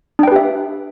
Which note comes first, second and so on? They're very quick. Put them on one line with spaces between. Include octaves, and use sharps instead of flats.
D4 G5 B4 G4 E5